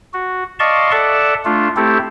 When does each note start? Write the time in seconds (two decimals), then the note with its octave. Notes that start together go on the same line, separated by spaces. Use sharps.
0.14 F#4
0.59 D5 D#5 F5 A5 C6 C#6
0.92 A4 D5 E5 F#5 A5
1.45 A3 D4 F4
1.76 A3 C4 E4 G4 A4